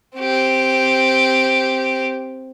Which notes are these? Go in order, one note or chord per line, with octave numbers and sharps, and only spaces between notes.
C4 G4